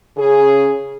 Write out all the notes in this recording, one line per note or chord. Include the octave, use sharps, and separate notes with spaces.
C#3 G#4